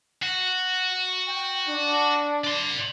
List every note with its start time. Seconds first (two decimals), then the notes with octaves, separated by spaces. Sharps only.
0.22 F#4
1.29 G5
1.68 D4
2.44 D5 C6